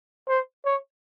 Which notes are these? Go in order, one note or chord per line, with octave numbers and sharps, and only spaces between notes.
C5
C#5